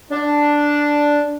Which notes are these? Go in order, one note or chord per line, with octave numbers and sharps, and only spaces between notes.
D4